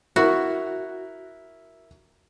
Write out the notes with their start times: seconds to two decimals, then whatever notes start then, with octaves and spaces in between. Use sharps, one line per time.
0.16 E4 F#4 A#4